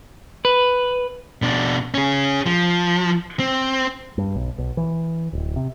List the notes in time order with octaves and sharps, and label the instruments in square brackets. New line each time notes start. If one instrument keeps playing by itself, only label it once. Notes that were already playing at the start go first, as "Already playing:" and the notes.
[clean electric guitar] B4
[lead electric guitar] B2 D4
C#4 G#4
F3
C4
[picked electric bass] G2
B1
B1
E3
D1
C3